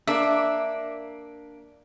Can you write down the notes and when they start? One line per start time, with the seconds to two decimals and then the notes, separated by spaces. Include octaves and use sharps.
0.07 A#3 D4 E5